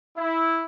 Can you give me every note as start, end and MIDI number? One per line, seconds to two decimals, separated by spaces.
0.17 0.64 64